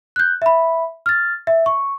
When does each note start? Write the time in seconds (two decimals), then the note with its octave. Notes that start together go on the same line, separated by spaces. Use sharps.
0.16 F#6 G6
0.42 E5 B5
1.06 F6 A6
1.47 E5
1.66 C#6